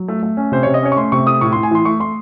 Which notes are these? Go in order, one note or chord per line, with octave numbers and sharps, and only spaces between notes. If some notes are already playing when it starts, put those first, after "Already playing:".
Already playing: F#3
A3
A3
C#4
C3 C5
C3 C#5
D#5
C#4 C#5
C#6
A3 C6
C3 C#6
A3 D#6
A2 C#6
A2 C6
G#5
E3 C6
A3 C#6
A3 C6